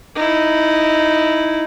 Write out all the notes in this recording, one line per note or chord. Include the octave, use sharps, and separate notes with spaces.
D#4 E4